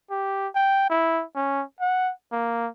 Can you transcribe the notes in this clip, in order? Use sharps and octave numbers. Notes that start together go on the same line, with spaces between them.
G4
G5
E4
C#4
F#5
A#3